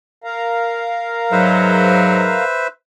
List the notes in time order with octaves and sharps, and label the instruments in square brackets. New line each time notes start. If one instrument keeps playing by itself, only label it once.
[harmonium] A#4 F5 A#5
[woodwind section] G#2 F#3 [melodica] B4 C5 E5